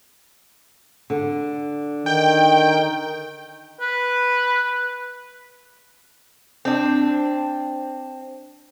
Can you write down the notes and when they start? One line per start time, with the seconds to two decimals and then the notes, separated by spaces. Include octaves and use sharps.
1.10 D3
2.06 D#3 G5
3.80 B4
6.65 C4 D4